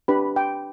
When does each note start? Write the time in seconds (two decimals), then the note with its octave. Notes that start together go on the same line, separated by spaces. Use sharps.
0.08 D4 G4 B4 B5
0.36 G5